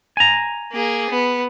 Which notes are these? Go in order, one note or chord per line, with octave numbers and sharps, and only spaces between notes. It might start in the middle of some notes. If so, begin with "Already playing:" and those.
G#5 A#5
A#3 G#4
B3